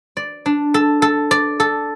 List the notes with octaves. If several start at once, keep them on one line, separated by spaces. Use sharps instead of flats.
D5
D4
A4
A4
D5
A4